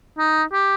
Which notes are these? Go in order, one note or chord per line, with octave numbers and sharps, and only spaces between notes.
D#4
G4